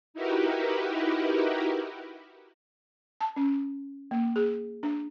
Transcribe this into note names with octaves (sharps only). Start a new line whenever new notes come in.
D#4 E4 F#4 G4 A#4 B4
A5
C#4
A#3
G#4
D4